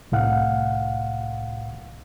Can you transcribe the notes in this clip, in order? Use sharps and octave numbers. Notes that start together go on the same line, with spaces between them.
C2 A2 F5 F#5